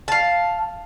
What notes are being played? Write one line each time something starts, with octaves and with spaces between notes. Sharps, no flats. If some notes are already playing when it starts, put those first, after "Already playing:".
F5 A5